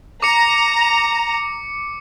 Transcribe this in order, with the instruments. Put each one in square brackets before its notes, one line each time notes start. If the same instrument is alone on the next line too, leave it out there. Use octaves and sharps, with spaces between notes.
[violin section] A#5 [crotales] D6 C#7